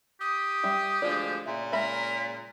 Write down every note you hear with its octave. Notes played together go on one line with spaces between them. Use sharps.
G4 D#6
G3 E5 G5
D2 F3 G#3 D5
A#2 C#3 E5
G#3 A#4 E5 B5 B6